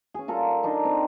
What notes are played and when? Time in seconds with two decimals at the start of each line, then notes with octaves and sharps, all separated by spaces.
0.14 C#4 G#4
0.28 G3 F4 A4 A#4
0.63 D4 D#4 C6
0.85 C4